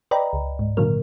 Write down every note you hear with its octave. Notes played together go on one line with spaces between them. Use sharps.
B4 D5 D#5 G5 A#5 B5
C#2
G#2
A#2 D3 D#3 F#3 A#3 A#4